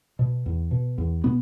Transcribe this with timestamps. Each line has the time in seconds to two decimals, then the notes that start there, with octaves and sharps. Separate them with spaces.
0.19 B2
0.46 E2
0.71 B2
0.98 E2
1.24 B2 B3